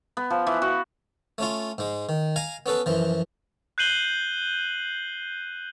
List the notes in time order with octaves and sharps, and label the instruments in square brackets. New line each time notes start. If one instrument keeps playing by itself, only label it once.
[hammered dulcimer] B3
F3
E3
F#4
[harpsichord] A3 C#4 F4
G#2 G#3
D#3
F5 G#5 A#5
B3 C#4 A4 B4
F#2 E3 F3
[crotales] F#6 G6 C7 D#7 F#7 G7